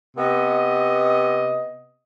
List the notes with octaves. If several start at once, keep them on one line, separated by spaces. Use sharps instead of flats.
C3 B3 D#5